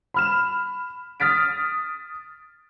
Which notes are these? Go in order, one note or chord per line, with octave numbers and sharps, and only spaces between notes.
B5 F6 E7
D#6 F6 A6 B6 D7